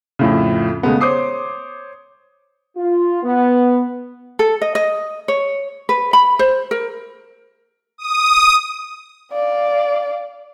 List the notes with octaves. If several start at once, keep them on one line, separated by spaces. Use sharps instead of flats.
F2 A2 C#3
C#3 G#3 A3 B3
C5 C#5 D6 D#6 C7
F4
B3
A4
D#5
D#5
C#5
B4
B5
C5
A#4
D#6
D5 F5